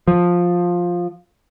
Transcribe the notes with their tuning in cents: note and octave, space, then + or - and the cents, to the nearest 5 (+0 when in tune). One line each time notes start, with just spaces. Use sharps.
F3 +10